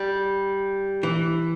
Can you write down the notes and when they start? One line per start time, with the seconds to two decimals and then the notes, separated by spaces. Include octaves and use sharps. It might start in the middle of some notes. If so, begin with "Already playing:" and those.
Already playing: G3
1.03 E3